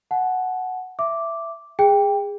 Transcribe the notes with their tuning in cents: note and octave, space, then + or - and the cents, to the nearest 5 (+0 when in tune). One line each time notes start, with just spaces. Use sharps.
F#5 +0 A5 -35
E5 +10 D6 -5
G#4 -20 G5 +15